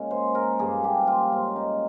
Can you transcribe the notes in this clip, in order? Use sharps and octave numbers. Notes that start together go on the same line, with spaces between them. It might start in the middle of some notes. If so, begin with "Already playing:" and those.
Already playing: A#2 G#3 C#4
C5
A#4
G2 F3 A#3 G#4
G4
F4
G#2 G3 C#4 F4
D#4